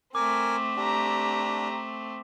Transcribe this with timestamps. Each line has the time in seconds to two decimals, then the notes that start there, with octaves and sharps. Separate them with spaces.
0.15 A3 C4 A#4 G#5 D6
0.76 D4 G4 A#5